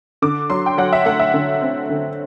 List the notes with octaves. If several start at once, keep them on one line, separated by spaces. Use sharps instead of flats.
D3 D6
F#3 C6
G5
F#3 F#5
E5
A3 F#5
E5
D3
C4
D3